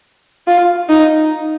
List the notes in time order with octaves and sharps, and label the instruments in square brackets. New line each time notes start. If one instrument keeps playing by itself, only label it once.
[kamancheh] F4
D#4